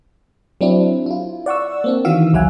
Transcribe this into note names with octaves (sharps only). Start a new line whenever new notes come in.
F#3 C4 D4 E4
E4 F4
D5 F#5 C#6 E6
A#3 C4 D4
D#3 E3 F#4 F5 E6
A1 D2 F#3 E5 F#5 G#5